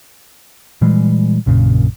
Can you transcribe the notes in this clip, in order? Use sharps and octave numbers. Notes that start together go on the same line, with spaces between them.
A#2 E3 G3 G#3
A#1 F#2 A#2 C#3